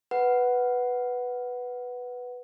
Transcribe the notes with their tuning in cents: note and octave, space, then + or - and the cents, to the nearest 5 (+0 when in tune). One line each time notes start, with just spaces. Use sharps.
B4 +0 F#5 +0